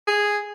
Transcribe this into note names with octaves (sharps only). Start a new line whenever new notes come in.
G#4